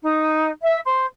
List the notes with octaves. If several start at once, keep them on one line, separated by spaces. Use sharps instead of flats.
D#4
E5
C5